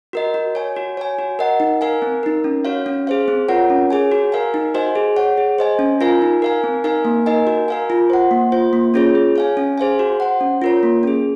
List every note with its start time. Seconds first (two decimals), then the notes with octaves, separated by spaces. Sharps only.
0.13 F#4 A#4 D#5
0.34 F#4
0.55 C#5 G#5
0.76 F#4
0.97 C#5 G#5
1.19 F#4
1.39 A#4 D#5 F#5
1.60 D#4
1.81 A#4 F5 G#5
2.02 C4
2.23 D#4 A#4
2.44 C#4
2.65 F#4 C#5 F5
2.86 C#4
3.07 G#4 C5 F5
3.28 C4
3.49 F4 A#4 C#5 F#5
3.70 C#4
3.90 G#4 C#5 G#5
4.12 F#4
4.32 A#4 F5 G#5
4.54 D#4
4.74 F#4 C5 D#5 G#5
4.95 G#4
5.16 C#5 F#5
5.37 G#4
5.58 C5 D#5 G#5
5.79 C#4
6.01 F4 A#4 F5 G#5
6.22 D#4
6.42 A#4 F5 G#5
6.64 C4
6.84 D#4 A#4 F5 G#5
7.05 A#3
7.26 D#4 A#4 D#5 G#5
7.47 F#4
7.68 A#4 F5 G#5
7.90 F4
8.10 C5 F#5
8.31 A#3
8.52 F4 C5
8.73 A#3
8.94 C#4 F4 G#4 C#5
9.15 G#4
9.36 C#5 F5 G#5
9.57 C#4
9.78 G#4 C5 F5 G#5
9.99 F#4
10.20 C5 F#5
10.41 C#4
10.62 F4 A#4 C#5
10.83 A#3
11.03 C#4 G#4